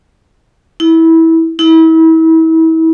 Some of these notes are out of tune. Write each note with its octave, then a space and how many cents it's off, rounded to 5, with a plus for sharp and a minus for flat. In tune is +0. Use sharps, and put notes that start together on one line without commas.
E4 -20
E4 -35